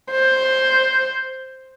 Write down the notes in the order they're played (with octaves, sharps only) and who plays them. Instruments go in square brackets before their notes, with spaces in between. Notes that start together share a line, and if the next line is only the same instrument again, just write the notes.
[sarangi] C5